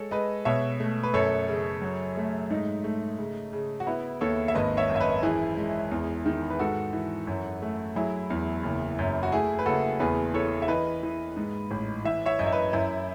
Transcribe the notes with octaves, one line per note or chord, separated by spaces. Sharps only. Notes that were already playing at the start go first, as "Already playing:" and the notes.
Already playing: G#3 A4 C#5
G#3 B4 D#5
B2 C#5 E5
A3
B4
F#2 A4 C#5
C#3
F#3
A3
G#2 D#4
A3
C#3
C#3
F#4
B3 E4
D#2 A4 C#5
E5
G#1 B4 D#5
C#5 E5
F#2
E5
B4 D#5
E3 E4 G#4
G#3
E2
D#3
B4
G#2 F#4 A4
E3
F#2
A3
F#3 E4 G#4
E2
F#1
F#2
F#4
A3 E4 G#4
B4
F#1 F#4 A4
E2 G#4 B4
E3 A4 C#5
E5
E3 B4 D#5
E3
G#2
A1
E3 E5
C#5 E5
F#2 D#5
E5
B4 D#5
F#2 E4